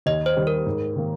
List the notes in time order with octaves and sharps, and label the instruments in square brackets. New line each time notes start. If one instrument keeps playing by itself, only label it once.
[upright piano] D#2 [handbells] D#5
[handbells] C5
[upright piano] D#3 G3
[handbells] A#4
[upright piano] G#2
D#3 A#3